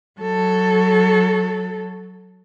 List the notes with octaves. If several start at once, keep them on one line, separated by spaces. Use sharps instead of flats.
F#3 A4